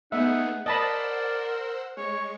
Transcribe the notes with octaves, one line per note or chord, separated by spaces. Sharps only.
A3 B3 D#4 G#4 E5 F#5
A#4 C5 D5 D#5 F#5 A5 B5 E6
G#3 C#5 C#6